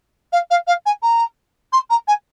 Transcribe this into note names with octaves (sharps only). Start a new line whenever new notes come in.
F5
F5
F5
G#5
A#5
C6
A#5
G#5